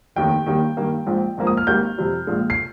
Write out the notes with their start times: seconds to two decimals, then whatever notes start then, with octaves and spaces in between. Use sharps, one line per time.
0.16 F1 D#2 D#3 G5
0.46 D#2 D#3 G3 A#3
0.77 G2 D#3 A#3
1.07 A#1 G#2 F3
1.37 A#1 G#2 F3 A#3
1.47 D#6
1.57 F6
1.67 G#1 G#2 G3 A#3 G6
1.98 F2 C3 G3
2.27 A#1 A#2 G#3
2.50 C7